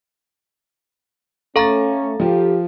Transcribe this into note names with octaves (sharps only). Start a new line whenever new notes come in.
A3 C#4 A4 F5 A#5 C#6 A6
F3 F4 G4